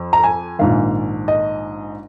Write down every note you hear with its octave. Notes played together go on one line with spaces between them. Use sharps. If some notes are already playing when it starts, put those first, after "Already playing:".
Already playing: F2
A#5
G#5
A#1 G#2 D#3 F5
D#5